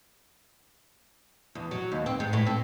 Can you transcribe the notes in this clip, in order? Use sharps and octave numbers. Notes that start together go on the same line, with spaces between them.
E2
F#3
D#2
C4
G#2
A2
C4